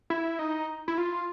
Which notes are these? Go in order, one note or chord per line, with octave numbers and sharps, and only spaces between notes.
E4
D#4
E4
F4